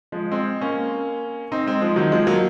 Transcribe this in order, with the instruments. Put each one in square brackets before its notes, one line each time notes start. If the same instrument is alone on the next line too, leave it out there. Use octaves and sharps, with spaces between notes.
[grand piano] F3 G#3
G#3 C4
A#3 C#4
C4 D#4
G#3 C4
F3 G#3
D#3 F#3
F3 G#3
F#3 A#3